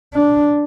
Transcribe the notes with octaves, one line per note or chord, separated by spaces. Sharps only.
D4